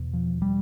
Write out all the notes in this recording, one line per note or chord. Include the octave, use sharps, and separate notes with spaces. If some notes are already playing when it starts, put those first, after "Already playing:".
Already playing: E2 B2
F3
G3